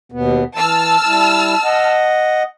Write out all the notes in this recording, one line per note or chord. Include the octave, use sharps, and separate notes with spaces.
D#2 B2 B3
E3 A5 E6 F6
G3 E4
D#5 F#5